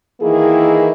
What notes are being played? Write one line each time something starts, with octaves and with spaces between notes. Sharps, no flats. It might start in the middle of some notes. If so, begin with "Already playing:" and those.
D#3 E3 A#3 E4 G#4